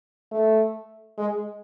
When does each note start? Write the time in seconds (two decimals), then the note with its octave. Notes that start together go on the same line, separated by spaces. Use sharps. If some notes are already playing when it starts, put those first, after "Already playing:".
0.32 A3
1.18 G#3